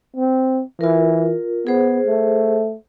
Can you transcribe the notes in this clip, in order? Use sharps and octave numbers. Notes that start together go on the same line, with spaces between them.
C4
E3 F4 A#4
B3 G#4 C5
A3